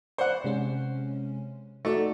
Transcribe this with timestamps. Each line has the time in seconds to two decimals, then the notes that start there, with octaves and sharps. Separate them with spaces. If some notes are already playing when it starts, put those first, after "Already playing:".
0.18 B4 C5 D5 F#5 C#6
0.44 C3 G#3 C#4
1.85 A3 D#4 F#4 D5